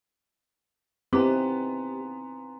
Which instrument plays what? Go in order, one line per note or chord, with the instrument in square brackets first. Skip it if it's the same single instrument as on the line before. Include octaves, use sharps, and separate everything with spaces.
[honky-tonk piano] B3 [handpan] C4 D#4 E4 [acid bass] G4 [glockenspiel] G#5 A#5 C6